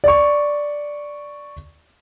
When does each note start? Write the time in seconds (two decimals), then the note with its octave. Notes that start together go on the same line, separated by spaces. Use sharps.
0.04 D5 C#6